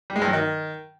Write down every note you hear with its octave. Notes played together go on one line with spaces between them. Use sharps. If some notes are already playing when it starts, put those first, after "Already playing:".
G3
G#3
G2
F#3
D#3